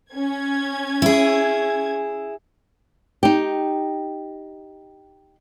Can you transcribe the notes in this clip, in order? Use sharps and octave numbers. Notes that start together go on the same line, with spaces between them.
C#4 G#6
E4 G#4
D#4 G4